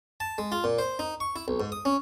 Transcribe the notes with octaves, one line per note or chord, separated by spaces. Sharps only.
A5
G#3
F4
A#2
C5
D#4
C#6
E4
B1
G#2
D#6
C#4